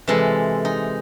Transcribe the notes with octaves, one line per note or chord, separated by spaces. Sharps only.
C3 E3 G#3 A4
D#4